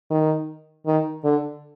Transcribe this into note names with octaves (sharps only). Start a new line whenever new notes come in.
D#3
D#3
D3